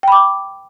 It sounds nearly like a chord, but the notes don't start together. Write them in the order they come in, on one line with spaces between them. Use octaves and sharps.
G5 B5 D6